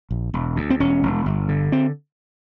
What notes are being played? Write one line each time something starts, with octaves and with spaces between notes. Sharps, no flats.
A#1
E1
D2
C4
E1 C#4
E1
G1
D3
C4